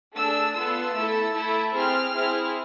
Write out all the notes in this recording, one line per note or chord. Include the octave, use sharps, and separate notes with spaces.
A3 D4 G#4 E6
B3 F4 A4 E6
A3 E4 A4
A3 E4 A4
C4 G#4 F6
C4 E4 G#4